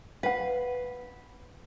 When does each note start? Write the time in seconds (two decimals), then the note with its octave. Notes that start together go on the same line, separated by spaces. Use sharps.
0.23 B4 F5 F#5